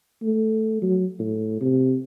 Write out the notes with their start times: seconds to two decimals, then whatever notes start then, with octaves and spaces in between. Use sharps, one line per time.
0.23 A3
0.82 F#3
1.19 A2
1.61 C3